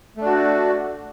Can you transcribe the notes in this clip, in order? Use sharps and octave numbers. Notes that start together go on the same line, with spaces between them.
A3 D4 F#4